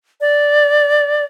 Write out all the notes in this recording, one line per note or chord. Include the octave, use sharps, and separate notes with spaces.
D5